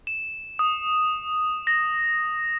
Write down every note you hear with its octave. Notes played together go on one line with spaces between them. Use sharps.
E7
D#6
A#6